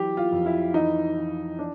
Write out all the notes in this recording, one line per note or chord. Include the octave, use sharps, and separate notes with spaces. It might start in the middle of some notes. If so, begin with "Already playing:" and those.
Already playing: E3 F#3 G4
F4
F2
E4
E3 D#4
E3
D4